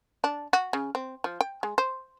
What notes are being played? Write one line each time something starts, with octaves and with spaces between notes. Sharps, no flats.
D4
F#4
C#3
C4
F3
G5
G#3
C5